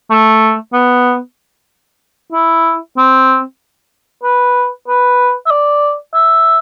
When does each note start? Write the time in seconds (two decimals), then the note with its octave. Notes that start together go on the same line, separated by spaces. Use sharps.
0.10 A3
0.73 B3
2.32 E4
2.97 C4
4.23 B4
4.88 B4
5.46 E5
5.51 D5
6.14 E5